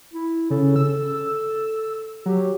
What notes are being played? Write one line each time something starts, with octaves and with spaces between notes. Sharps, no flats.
E4
C#3 A4
E6
F#3 G4